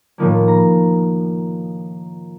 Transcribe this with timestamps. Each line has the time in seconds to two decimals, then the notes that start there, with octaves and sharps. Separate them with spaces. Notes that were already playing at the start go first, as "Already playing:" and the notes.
0.18 A2 D#3 F3 A#3
0.48 A#5